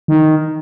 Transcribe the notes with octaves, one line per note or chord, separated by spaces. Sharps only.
D#3